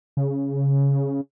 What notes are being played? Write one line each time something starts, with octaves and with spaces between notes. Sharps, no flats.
C#3